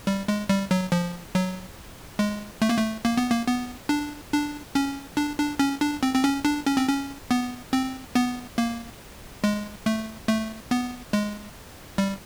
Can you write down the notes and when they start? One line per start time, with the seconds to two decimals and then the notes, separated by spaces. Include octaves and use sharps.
0.07 G3
0.28 G#3
0.49 G3
0.71 F#3
0.92 F3
1.35 F#3
2.19 G#3
2.62 A3
2.69 A#3
2.78 A3
3.05 A#3
3.17 B3
3.31 A#3
3.47 B3
3.89 D4
4.32 D4
4.75 C#4
5.17 D4
5.39 D4
5.59 C#4
5.81 D4
6.03 C4
6.15 C4
6.24 C#4
6.45 D4
6.66 C#4
6.77 C4
6.88 C#4
7.31 B3
7.73 C4
8.15 B3
8.58 A#3
9.44 G#3
9.86 A3
10.28 A3
10.71 B3
11.13 G#3
11.98 G3